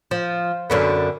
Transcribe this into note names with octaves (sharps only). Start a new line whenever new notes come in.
F3
F#2 D3 B3